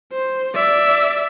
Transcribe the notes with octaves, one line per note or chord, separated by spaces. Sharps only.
C5
D5 E5